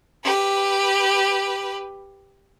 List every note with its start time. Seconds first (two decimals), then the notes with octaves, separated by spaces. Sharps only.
0.24 G4 B4